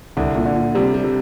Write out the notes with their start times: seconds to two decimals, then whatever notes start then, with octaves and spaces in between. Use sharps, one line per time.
0.17 C2 D3
0.36 A#2
0.45 D3
0.56 A#2
0.75 C3 G3
0.94 G3
1.04 C3